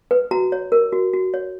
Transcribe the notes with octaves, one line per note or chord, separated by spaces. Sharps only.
B4
F#4 A#5
C#5
A#4
F#4
F#4
C#5